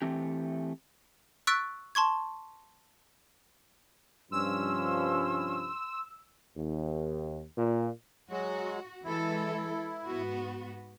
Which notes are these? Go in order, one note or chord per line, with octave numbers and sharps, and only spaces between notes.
E3 A3 C4 G4
C#6 E6 F#6 A6 B6 D7
A5 C6 C#6 G#6
G2 C3 F3 C#4 C6 E6
D#2
A#2
F#3 G#3 F#4
E3 G#3 E4 A4
G#2 B3 F#4